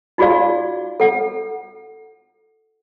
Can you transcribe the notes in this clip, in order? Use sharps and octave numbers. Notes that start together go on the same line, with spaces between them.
D#4 F4 F#4 G#4 D5 F5
A4 F#5